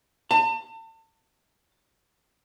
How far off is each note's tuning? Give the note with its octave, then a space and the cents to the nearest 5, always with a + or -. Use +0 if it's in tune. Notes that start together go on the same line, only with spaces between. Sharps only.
A5 +35